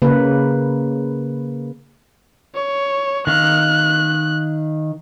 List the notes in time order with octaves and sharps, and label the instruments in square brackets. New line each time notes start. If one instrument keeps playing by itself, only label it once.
[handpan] C#3 A#3 B4
[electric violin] C#5
[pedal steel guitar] D#3 F5 [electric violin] F#6